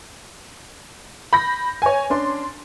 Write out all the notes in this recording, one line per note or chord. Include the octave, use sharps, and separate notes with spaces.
B5 G6 A#6
C#5 G#5
C#4 D4 C6